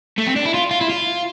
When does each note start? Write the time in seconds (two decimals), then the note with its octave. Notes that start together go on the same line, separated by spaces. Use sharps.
0.18 A3
0.27 C4
0.36 D4
0.45 E4
0.54 F4
0.71 F4
0.81 E4
0.90 F4